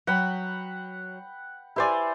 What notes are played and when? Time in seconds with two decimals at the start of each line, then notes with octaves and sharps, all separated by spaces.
0.07 F#3 F#5 G5 B5
1.76 E4 G4 B4 C5 D5 G#5